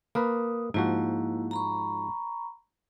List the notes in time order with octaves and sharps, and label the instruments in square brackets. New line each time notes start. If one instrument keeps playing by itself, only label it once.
[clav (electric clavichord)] A#3 A#4 B4 [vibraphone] D#6
[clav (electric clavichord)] G#2 F3 F#4 [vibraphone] A#3 E4
[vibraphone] A#5 B5 C#6